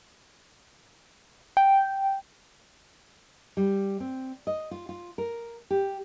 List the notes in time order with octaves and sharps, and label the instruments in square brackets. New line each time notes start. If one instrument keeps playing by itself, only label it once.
[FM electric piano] G5
[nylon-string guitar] G3
C4
D#5
F4
F4
A#4
G4